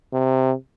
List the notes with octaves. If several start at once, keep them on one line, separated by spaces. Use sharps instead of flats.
C3